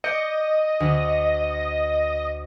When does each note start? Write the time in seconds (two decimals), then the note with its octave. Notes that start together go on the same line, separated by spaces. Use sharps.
0.04 D5 D#5 G6 C#7
0.80 D2